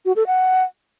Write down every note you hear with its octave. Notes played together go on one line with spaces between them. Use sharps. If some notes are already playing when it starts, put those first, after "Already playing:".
F#4
A4
F#5